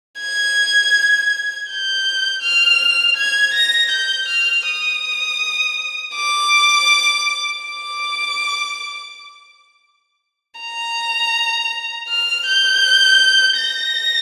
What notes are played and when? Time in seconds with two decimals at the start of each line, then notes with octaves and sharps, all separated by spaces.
0.20 G#6
1.69 G6
2.42 F6
3.17 G#6
3.54 A#6
3.91 G6
4.29 F6
4.66 D#6
6.15 D6
7.63 D6
10.60 A#5
12.09 F6
12.46 G6
13.58 A#6